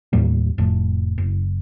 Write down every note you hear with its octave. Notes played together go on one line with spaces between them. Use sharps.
D#2 A2 G3 A#3
F1 A2
F#1